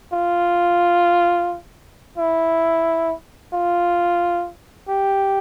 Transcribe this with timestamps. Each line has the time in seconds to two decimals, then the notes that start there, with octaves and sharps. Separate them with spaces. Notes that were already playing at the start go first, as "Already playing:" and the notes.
0.13 F4
2.18 E4
3.54 F4
4.89 G4